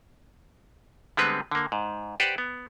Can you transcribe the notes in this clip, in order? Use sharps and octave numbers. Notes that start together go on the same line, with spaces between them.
D3 G3 G#3 B3 C4 B4
D3 A#3
G#2
G4 B4 C5 D5 F#5
B3